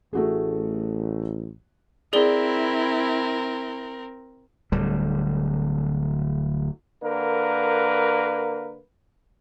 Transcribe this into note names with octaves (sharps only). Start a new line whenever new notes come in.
A1 A3 F#4 G#4
C4 E4 G#4 A#4 D5 G7
D1 D3 G3
D3 A#3 A#4 B4